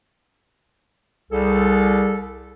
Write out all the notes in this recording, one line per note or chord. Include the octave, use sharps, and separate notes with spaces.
C2 G#4 A4